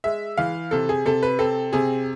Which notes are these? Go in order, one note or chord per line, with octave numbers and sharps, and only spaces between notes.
G#3 E5
E3 F5
C3 A4
G#4
C3 A4
B4
C4 A4
C3 G#4